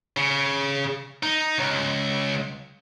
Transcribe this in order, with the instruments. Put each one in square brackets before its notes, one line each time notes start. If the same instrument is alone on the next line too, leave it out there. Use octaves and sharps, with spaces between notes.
[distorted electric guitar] C#3
D#4
C#2